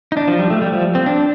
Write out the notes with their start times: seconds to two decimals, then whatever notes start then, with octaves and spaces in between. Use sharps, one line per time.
0.12 D#4
0.17 D4
0.28 F3
0.39 G3
0.50 A3
0.62 G3
0.72 F3
0.95 C4
1.06 D4